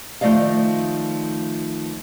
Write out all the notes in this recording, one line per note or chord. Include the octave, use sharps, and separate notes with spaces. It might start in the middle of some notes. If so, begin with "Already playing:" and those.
D#3 F3 A3 D5 D#5 F5